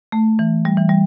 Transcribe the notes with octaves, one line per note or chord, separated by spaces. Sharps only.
A3
E3
G3
E3
G3